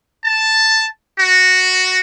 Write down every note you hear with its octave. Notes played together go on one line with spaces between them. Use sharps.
A5
F#4